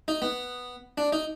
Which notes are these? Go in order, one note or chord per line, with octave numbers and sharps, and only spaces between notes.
D#4
B3
D4
D#4